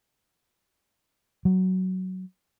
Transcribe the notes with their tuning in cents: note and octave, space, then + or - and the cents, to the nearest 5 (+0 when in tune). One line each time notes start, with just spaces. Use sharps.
F#3 +10